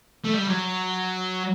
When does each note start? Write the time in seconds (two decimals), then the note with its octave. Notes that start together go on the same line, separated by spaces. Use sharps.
0.24 A3
0.33 G3
0.47 F#3